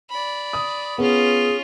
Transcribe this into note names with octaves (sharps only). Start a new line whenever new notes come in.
D5 B5
D#6
B3 C#4 F4 G#4